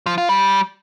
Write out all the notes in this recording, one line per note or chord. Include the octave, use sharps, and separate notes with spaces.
F3
F4
G3